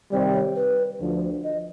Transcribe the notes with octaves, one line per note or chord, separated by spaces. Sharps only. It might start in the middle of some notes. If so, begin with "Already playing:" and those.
C3 D#3 G3 C4 D5
C#5
B4
D2 D3 F3
D#5